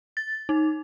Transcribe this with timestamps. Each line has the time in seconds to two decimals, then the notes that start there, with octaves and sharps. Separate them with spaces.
0.17 A6
0.49 D#4